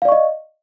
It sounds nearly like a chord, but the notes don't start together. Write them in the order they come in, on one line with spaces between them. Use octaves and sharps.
F5 D5 C#6 D#5